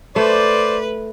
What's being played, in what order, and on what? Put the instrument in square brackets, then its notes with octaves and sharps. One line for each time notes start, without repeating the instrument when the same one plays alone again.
[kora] A3 [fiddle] B4 [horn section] C5 D5